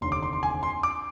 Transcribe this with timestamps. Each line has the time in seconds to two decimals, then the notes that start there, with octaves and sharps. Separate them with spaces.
0.01 F1 D#2 D3 C6
0.12 D6
0.23 C6
0.33 C6
0.43 G#5
0.63 C6
0.83 D6